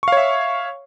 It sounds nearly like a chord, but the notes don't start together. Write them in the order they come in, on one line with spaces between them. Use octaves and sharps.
C#6 F5 C#5 E5